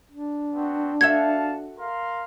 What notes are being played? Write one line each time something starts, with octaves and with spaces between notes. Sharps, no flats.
D4
B3 C4 F#4
F#4 A4 E5 F5 A5 G#6
A#4 F5 C6